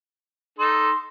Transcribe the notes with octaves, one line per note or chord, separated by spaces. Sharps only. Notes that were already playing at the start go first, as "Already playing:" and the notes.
D#4 A4 C6